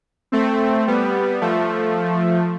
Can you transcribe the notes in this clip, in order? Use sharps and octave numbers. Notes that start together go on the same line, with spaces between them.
A3 C4
G3 B3
F3 A3